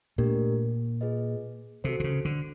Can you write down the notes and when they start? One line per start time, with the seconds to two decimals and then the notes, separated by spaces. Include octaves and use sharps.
0.18 A#2 A3 D4 G4 A#4
1.01 F4 G#4 B4 D#5
1.84 C3 F#4 A4 C5
2.00 C3
2.04 C#3
2.25 D3